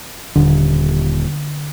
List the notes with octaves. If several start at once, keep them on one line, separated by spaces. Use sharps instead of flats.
D#1 D3